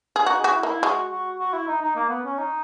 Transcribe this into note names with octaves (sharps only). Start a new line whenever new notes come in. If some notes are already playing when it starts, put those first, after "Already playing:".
G#4
D#4 F#4
F#4 G#4
E4
A#3 D#4 E4
G#3 F#4
F#4
F#4
E4
D#4
D#4
A#3
B3
C#4
D#4